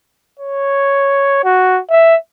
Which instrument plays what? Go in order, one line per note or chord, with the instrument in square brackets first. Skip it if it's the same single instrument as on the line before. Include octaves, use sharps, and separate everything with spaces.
[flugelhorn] C#5
F#4
E5